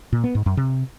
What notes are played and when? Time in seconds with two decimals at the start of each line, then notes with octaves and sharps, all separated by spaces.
0.12 A#2
0.24 B3
0.35 G#2
0.46 F#2
0.57 C3